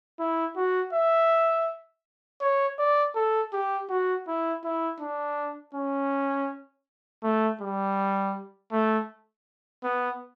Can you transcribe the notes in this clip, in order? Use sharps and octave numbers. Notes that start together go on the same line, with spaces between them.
E4
F#4
E5
C#5
D5
A4
G4
F#4
E4
E4
D4
C#4
A3
G3
A3
B3